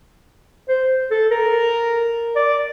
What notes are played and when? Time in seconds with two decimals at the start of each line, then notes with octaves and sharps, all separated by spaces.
0.69 C5
1.11 A4
1.31 A#4
2.36 D5